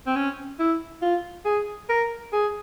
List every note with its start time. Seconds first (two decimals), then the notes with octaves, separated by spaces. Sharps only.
0.06 C4
0.15 C#4
0.59 E4
1.02 F4
1.45 G#4
1.89 A#4
2.33 G#4